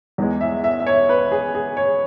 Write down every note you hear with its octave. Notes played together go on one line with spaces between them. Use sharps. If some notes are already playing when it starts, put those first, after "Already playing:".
E2 E3 G#3
E5
E5
E5
C#5
B4
G#4
G#4
C#5